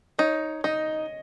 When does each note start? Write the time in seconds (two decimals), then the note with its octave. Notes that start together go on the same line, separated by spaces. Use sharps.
0.18 D#4 C#5
0.64 D#4 D#5